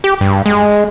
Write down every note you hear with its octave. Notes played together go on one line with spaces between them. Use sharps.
G4
G2
G#3